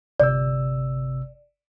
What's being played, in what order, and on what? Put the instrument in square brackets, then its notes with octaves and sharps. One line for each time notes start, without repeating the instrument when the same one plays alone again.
[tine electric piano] G1 C3 E6 [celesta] D5